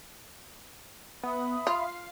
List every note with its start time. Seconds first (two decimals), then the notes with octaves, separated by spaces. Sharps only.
1.23 B3 E5 B5 D#6
1.67 F4 F5